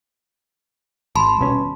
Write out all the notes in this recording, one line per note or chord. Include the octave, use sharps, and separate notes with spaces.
G#1 A5 B5 C6
D#1 B2 C#4